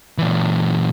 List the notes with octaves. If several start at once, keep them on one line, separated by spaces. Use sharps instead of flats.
A#2 E3